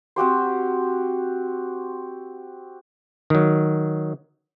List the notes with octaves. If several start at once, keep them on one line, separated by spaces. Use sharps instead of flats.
C4 F#4 G4 C5
D#3 F#3